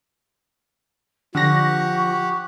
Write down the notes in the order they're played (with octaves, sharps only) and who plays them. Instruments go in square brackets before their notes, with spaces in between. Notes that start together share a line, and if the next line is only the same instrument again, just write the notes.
[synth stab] D3 A#6 [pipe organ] F3 [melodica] G4 F#5 [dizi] C#6